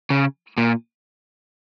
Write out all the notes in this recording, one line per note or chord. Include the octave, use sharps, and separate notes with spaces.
C#3
A#2